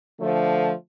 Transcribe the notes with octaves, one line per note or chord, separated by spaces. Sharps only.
D3 F3 A3